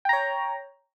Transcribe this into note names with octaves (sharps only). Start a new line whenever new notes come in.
C#5 G5 A#5